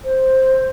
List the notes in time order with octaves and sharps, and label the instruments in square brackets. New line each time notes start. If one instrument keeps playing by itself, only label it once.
[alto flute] C5